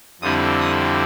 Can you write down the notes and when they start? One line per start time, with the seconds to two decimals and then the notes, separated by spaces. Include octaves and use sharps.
0.21 F2 D3 G3 C4 E4 D#6
0.60 D#6